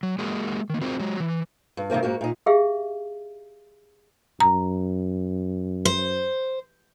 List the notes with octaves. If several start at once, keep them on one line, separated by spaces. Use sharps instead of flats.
F#3
G#3 A#3 F#4 G#4
D#3 A#3
C4 F4 F#4 G#4 A#4 C5
F#3 G#3
E3
G2
G2 C3 D#3 A#3 C4
G#2 A#3 F#4
A#2 D#4
G4 G#4 E5 F5
F#2 A#5
C5